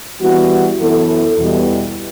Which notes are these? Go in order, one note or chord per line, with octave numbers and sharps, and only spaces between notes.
E3 G3 B3 F#4
F#2 E3 B3 E4 A4
E2 B2 G3